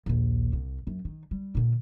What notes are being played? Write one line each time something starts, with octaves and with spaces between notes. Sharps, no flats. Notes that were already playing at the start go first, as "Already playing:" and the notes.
A#1 D#2
C2
F#2
D#3
G3
A#2 D3